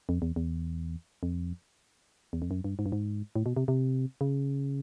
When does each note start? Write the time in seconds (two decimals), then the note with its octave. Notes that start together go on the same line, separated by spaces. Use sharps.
0.09 F2
0.22 E2
0.36 E2
1.23 F2
2.33 E2
2.42 F2
2.51 F#2
2.64 G2
2.79 G#2
2.86 G2
2.92 G#2
3.36 A2
3.46 B2
3.57 C3
3.68 C3
4.21 C#3